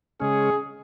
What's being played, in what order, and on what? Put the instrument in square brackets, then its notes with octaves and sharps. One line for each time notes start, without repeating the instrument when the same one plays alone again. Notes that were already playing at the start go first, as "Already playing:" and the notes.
[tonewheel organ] C#3 G#3 C#4 [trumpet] G#4